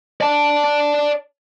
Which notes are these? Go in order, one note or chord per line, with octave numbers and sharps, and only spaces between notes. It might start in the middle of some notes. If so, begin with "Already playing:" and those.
D5 A5